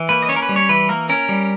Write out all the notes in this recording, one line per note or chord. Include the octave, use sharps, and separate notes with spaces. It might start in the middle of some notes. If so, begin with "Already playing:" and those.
Already playing: E3
A#3 B4
D#5
C#4 C#5
A#4
B4
G3
C#5
E3 B4
A#3 A#4
C#4 A#4
G3